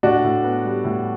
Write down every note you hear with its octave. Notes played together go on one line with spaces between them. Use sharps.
A2 D4 F#4
A2
B3
G3
A2